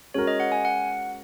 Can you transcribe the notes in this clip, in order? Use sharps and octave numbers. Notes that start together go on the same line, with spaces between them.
G#3 C#4 F#4 A#4 C#5
D#5
F#5
G#5
F#5